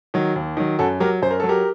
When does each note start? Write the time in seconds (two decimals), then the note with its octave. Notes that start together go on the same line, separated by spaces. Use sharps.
0.14 D#3 F#3
0.36 D#2
0.57 D#3 F#3
0.79 F#2 F#4 A4
1.00 F#3 G4 A#4
1.22 F#2 C5
1.31 A#4
1.40 F#3 A4
1.49 G4 A#4